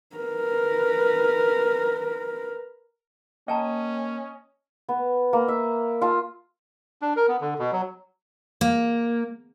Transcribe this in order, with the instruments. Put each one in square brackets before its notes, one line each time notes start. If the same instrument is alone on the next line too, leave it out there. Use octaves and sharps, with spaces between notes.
[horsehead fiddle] A#4 B4
[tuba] A#3 [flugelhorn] C#4 [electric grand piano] D#5 [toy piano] G5 A5 A#5
[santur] B3
A#3
E5
F4 A5
[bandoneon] D4
A#4
B3
D3
B2
F#3
[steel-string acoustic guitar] A#3